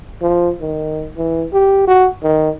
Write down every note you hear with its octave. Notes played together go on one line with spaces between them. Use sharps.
F3
D#3
E3
G4
F#4
D#3